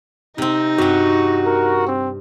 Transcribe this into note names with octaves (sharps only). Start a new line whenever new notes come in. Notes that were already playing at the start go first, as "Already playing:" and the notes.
C3 C4 D#4
G2 C4 F#4
A#4
C4